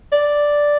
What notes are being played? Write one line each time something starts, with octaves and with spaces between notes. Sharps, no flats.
D5